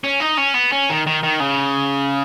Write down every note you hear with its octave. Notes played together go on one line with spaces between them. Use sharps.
C#4
D#4
C#4
B3
C#4
D#3
D#3
D#3
C#3